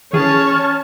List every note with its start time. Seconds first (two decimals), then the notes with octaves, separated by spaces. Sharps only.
0.13 E3 C#4 G#4 C#5 A5 F6